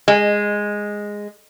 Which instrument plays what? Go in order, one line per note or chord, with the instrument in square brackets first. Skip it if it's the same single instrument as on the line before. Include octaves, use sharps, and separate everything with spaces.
[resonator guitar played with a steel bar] G#3